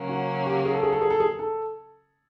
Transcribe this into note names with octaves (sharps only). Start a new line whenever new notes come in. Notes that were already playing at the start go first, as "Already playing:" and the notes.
Already playing: C#3 F#3 A#3 C#4
F#4
G4
G#4
A4
G#4
A4
G#4
A4
G#4
A4